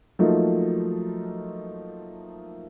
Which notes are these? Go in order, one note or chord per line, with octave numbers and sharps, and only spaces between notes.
F3 F#3 A3 A#3 D#4 F4